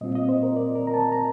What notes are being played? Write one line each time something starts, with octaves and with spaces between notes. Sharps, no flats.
A#2 G3 C4 F4 D#5
D#5
C5
A#4
D5
A#4
A#5
A5
A#5